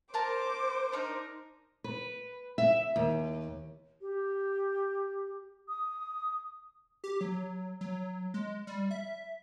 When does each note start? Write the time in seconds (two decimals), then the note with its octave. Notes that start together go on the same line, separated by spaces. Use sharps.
0.14 A#4 C5 A5 A#5 D6
0.92 D4 D#4 A#4
1.84 B4
2.58 E5
2.96 D#2
4.02 G4
5.68 D#6
7.04 G4
7.21 F#3
7.81 F#3
8.34 G#3
8.67 G3
8.91 E5